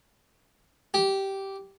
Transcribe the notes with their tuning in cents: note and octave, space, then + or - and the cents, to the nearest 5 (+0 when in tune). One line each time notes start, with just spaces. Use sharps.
G4 -10